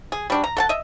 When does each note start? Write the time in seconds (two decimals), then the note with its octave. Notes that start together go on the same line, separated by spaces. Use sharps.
0.12 G#4
0.30 G3 D4 F#4
0.44 A#5
0.57 A4 F#5 A5
0.69 D#5 E5